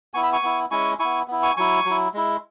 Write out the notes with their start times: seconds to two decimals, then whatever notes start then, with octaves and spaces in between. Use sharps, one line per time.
0.14 B3 E4 G#5 C#6
0.23 B5 E6
0.33 G#5 C#6
0.43 B3 E4
0.71 G#3 C#4 E4 G#5 C#6
0.99 B3 E4 G#5 C#6
1.28 B3 E4
1.43 G#5 C#6
1.57 F#3 E4 G#5 C#6
1.85 F#3 E4
2.14 G#3 E4